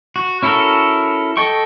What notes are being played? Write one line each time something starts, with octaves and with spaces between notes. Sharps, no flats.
F#4
C#4 E4 F#4 A4 A#4
A4 D#5 G5 C#6